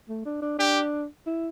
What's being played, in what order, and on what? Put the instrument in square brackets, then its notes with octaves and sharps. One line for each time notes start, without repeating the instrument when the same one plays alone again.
[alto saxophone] A3
D4
D4
[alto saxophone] D4 [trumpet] G4
[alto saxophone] E4